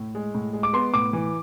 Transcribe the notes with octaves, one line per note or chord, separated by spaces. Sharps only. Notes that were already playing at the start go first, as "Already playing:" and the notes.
Already playing: A2
G#3
A2
G#3
D6
B3 C6
A2 D6
E3